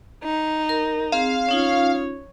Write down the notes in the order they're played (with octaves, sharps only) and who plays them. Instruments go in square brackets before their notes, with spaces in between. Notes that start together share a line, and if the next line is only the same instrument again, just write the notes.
[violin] D#4
[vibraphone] A#4
[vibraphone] C4 G#4 [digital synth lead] F5
[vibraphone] C#4 D#4 F4 [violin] C#5